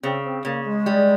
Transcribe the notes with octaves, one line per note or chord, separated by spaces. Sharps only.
C#3 C4
C4
C#3 A#3
G#3
G3